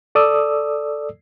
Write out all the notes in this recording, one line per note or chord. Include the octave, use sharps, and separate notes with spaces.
A4 D5 D#6 E6